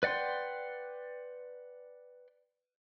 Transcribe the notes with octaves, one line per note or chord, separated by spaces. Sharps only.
B4 D5 F#5 G5 C6